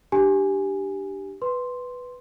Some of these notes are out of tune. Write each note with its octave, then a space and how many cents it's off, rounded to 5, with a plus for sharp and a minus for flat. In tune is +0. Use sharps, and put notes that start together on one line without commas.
D4 +20 G4 -10 G#5 +0
B4 +0 C6 +0